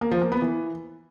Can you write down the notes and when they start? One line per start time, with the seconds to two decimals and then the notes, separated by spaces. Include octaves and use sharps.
0.01 A#3
0.11 F3
0.22 A#3
0.32 B3
0.42 E3